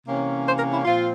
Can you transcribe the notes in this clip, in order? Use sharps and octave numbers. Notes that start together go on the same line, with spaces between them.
C3 E3 A#3 C#4
C5
A#4
E4
A#2 F3 C4 F4